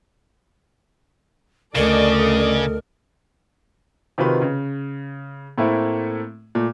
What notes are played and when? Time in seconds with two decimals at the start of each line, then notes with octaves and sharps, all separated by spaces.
1.75 D2 C#3 A4 A#4 D5 D#5
4.18 C3 D#3 F4 F#4 B4
4.41 C#3
5.58 A2 A3 A#3 C4 E4
6.55 A#2 A3